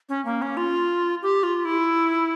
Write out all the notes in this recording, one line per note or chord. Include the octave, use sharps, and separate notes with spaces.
C#4
A#3
C#4
F4
G4
F4
E4